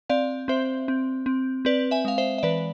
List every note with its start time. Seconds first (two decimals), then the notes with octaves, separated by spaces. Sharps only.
0.10 C4 D5 F5
0.48 C4 C5 E5
0.88 C4
1.26 C4
1.65 C4 B4 D5
1.91 E5 G#5
2.05 G#3 F5
2.18 C5 E5
2.38 E5
2.43 E3 B4 D5